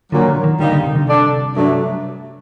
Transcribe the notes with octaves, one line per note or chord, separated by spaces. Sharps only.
A#2 D3 F#3 A#3
D3
D#3
A#2 D3 G3 A#3 D#4
D3
C3
D3
C3 G3 D4 A4 D5
G2 F#3 A3 D4